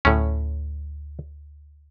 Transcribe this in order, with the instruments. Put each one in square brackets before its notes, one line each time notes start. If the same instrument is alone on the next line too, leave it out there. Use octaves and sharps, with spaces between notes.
[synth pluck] D2 [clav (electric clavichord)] A2 C#4